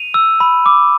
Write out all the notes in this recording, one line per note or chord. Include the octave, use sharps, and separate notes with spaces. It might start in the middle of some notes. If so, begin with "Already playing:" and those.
Already playing: D#7 F7
E6
B5
D6